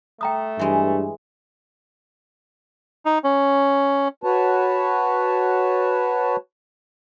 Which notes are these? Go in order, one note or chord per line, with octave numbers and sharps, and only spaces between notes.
A3 G5 A#5 D#6
G2 E3 G#3
D#4
C#4
F#4 B4 C#5 A5